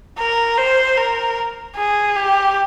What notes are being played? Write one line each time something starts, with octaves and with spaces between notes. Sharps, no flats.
A#4
C5
A#4
G#4
G4